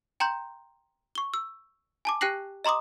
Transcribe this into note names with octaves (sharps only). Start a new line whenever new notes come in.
G5 A#5 C6 G6
C#6 G7
E6
G#5 A5 D6
G4 G5 F#6 A#6 C7 F#7
D#5 A#5 C6 D6 D#6